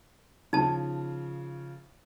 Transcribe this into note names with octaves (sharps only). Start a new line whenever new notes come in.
C#3 F3 D#4 A5